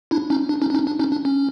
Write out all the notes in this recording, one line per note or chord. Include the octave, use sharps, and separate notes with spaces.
D4 E4
C#4 D#4
D4
C#4 D#4
D4
C#4 D#4
D4
C#4 D#4
D4
C#4